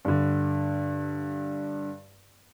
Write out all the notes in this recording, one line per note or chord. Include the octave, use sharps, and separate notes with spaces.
G2 D3